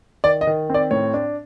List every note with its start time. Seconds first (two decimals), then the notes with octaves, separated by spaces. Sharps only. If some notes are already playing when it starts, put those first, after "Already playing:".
0.24 D#3 D5
0.41 D#5
0.47 D#3
0.70 C4 D5
0.91 A2 C#5
1.14 D4